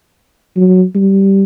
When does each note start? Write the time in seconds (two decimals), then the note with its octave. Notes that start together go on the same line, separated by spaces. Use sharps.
0.57 F#3
0.95 G3